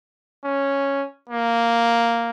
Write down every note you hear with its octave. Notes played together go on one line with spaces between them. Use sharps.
C#4
A#3